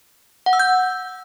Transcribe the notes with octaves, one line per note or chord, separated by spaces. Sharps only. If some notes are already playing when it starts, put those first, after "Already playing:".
F#5
E6
G6